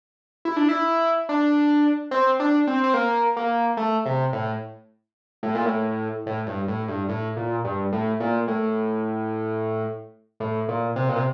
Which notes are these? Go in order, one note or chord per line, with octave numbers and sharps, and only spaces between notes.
E4
D4
E4
D4
C4
D4
C4
C4
A#3
A#3
A3
C3
A2
A2
A#2
A2
A2
G2
A2
G2
A2
A#2
G2
A2
A#2
A2
A2
A#2
C3
A#2
C3